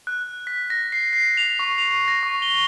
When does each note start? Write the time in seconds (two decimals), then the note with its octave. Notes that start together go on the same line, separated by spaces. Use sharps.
0.07 F#6
0.47 B6
0.70 A#6
0.92 C7
1.13 C7
1.37 F7
1.59 C#6
1.78 F7
2.08 A#6
2.23 C#6
2.42 G7